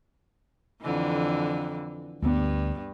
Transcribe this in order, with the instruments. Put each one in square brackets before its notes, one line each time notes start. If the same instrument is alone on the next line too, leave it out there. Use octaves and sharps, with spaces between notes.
[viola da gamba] F2 D3 E3
[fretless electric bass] D2 B3 [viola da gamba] G2